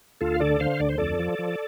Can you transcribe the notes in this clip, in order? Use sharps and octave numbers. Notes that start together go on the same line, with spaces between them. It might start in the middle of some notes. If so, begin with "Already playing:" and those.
D2 F4 A4
F5
D3 A4 D5
D3 C5 F5
D2 D5
C5
F2 A4 D5
F3
F3